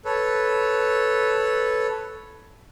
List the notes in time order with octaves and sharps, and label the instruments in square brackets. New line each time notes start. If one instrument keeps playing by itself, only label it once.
[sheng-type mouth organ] A4 B4 C#5